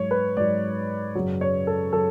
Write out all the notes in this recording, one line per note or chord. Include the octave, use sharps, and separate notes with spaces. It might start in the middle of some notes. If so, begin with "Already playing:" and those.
Already playing: G#2 F#3 C#5
B4
G#2 F#3 D5
F#2 C#3 F#3
C#5
A4
C#3 F#3 A4